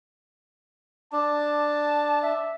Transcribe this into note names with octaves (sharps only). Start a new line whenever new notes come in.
D4 A5
E5